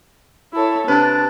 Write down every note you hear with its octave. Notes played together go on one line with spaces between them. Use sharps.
E4 A4 C#5
C3 D4 B4 A5